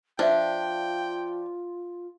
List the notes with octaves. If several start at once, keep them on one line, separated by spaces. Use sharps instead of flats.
F3 D4 F4 B4 D5 E5 G5